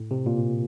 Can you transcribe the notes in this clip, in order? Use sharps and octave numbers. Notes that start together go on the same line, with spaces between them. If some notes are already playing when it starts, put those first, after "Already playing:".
Already playing: A2
C3
A#2